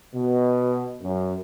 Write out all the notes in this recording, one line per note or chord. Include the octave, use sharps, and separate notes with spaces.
B2
F#2